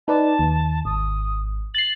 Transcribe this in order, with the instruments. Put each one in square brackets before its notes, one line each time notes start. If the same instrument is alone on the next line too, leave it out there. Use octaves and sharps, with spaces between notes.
[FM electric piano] D#4 B4 D5 [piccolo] A5
[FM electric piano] D#2
[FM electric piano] G#1 [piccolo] D#6
[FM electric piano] A6 C7 [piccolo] F#7